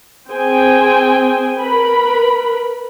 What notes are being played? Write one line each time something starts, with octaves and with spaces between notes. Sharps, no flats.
C4 G#4 C5 G5 G#5
A#4 B4 B5